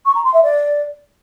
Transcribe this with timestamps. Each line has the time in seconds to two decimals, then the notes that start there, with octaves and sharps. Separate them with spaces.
0.06 C#6
0.15 A#5
0.24 C6
0.34 E5
0.43 D5